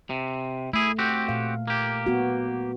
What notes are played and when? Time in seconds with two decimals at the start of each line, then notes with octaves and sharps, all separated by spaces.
0.10 C3
0.73 A3 E4 G#4
0.99 C4 F#4 G4
1.28 A#2 F5
1.68 A#3 G4
2.06 B3 F#4